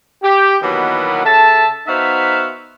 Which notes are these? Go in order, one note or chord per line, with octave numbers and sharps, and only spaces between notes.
G4
B2 D#3 E3 F#3 A#3 B3
C#3 A4 E5 A5
B3 D#4 F#4 C5 E5 F5